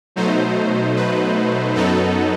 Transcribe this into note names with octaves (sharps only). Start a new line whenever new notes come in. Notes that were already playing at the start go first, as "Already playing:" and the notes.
B2 F#3 A3 D#4 C5
B4
F#2 F#3 B3 D#4 A4